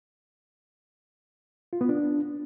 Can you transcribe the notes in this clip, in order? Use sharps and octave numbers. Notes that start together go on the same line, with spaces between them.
F4
B3
D4